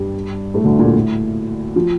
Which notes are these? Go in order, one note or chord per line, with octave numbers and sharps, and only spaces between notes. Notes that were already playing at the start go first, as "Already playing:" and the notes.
Already playing: G2 G3
A2 A3
D2 D3
A#2
A2
F3